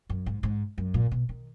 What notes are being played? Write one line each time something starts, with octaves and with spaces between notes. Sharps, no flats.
F#2
G#2
G#2
F#2
A#2
B2
D#3